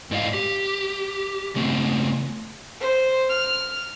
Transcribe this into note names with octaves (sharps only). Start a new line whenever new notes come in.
G#2 E4 D5 D#5 F5
G4
C#3 A3 B3 C4
C5
F6